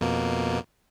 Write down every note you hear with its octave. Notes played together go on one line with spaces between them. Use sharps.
F2 B2 A#3